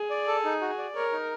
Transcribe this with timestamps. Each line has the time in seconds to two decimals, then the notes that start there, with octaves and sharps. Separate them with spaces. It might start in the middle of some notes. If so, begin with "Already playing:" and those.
Already playing: G#4
0.10 D5
0.27 A4
0.45 D#4
0.61 F#4
0.78 D5
0.95 A#4 C#5
1.12 D#4